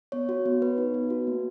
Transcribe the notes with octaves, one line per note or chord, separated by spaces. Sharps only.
B3 C#5
F#4
B3
B3 B4
D#4
B3
F#4
A#3